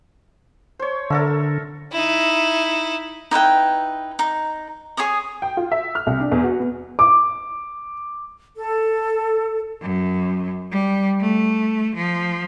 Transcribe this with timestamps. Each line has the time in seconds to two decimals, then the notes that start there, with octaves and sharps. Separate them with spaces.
0.79 C5 C#5
1.10 D3 A4 A#4 E5
1.92 D#4 E4
3.31 D#4 E4 B4 G5
4.19 D#4
4.97 G#4 C#5 C#6 D#6
5.42 G5
5.57 F4
5.72 E5
5.95 F6
6.07 C2
6.20 D4
6.32 E2
6.44 F#4
6.60 B3
6.99 D6
8.56 A4
9.82 F#2
10.72 G3
11.21 A3
11.95 F3